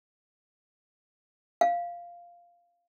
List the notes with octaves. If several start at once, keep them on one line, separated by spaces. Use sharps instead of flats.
F5